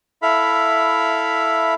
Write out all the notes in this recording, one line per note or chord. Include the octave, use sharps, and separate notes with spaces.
E4 A4 E5 F5 B5